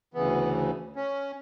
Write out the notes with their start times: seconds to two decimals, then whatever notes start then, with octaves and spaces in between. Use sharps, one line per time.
0.14 D2 C#3 E3 B3
0.96 C#4